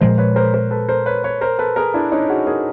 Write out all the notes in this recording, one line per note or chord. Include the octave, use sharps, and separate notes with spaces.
A#2 F3 G#3 A#4 C5
B4 C#5
A#4 C5
A#4 C5
A4 B4
A#4 C5
B4 C#5
B4 C#5
A#4 C5
A4 B4
G#4 A#4
D4 E4
C#4 D#4
F#4 G#4
G#4 A#4